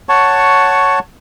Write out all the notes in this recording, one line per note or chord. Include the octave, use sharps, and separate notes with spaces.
C#5 F#5 A5 C#6